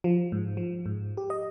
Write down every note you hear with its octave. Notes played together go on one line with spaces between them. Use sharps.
F3
G#2
F3
G#2
G4
D#5